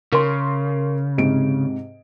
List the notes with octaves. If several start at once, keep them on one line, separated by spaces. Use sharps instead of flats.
C#3 A#4 C6
G#2 C3 D7